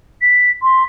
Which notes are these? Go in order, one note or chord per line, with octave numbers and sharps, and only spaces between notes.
B6
C6